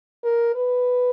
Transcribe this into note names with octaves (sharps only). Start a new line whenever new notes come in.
A#4
B4